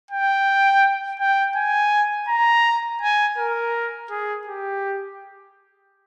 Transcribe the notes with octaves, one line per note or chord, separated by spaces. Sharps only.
G5
G5
G#5
A#5
G#5
A#4
G#4
G4